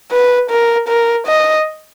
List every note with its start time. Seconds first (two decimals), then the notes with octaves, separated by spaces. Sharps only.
0.12 B4
0.50 A#4
0.88 A#4
1.27 D#5